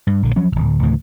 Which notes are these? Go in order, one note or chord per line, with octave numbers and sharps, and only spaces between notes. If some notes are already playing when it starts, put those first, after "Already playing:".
G2
A#1 D3
F3 F#3 C#4
D1 C#2
D2 A2 C#3 E3